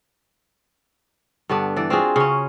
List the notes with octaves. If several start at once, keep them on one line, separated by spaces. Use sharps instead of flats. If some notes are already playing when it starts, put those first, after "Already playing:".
G2 D3 B3 D4
E3 D5
C4 F4 F#4 G#4
C#3 C#4